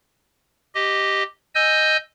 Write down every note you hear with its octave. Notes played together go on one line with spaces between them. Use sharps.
G4 D#5
D#5 G#5 E6 G6